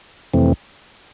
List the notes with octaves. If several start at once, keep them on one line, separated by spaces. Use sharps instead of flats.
F2 C3 E3 A3 C4